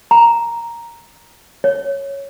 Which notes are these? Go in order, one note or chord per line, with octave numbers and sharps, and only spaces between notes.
A#5
C#5